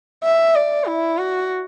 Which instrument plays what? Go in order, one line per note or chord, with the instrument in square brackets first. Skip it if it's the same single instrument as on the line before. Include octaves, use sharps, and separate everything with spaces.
[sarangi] E5
D5
E4
F#4